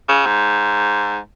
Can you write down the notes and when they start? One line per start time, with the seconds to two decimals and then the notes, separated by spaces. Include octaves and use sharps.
0.08 C#3
0.26 G#2